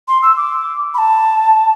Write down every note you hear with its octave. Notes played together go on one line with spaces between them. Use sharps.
C6
E6
D6
B5
A5